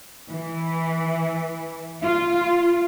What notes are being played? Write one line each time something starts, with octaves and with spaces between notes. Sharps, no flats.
E3
F4